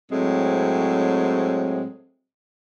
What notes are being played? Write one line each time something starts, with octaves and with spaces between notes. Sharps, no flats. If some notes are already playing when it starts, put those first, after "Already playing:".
A2 F#3 G#3 C4